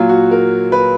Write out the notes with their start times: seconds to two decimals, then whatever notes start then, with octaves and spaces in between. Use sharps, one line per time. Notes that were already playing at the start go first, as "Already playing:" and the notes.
Already playing: A#2 F#3 F4
0.09 F#4
0.31 A#4
0.72 B4